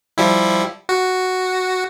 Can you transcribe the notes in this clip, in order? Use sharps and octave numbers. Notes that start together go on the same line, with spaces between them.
F3 G3 E4
F#4